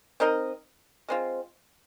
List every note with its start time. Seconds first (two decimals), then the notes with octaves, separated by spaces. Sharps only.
0.20 C4 D#4 A#4 D#5
1.09 G#3 C4 F4